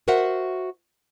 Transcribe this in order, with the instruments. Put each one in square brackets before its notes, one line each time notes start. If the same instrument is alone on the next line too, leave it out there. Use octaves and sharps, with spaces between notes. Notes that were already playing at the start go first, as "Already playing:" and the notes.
[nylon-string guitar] F#4 A#4 C5 E5 F#5